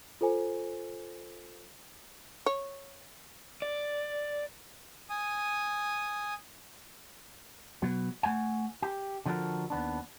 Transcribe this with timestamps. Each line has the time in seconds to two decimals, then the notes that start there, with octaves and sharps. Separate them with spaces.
0.21 F4 A4 C5 G#5
2.46 C#5
3.62 D5
5.09 G#5 D#6
7.82 B2 F#3 B3
8.23 A3 F#5 G#5
8.82 G4
9.26 D3 F3 F#4 G4 A4 A#4
9.70 D#2 B3 D4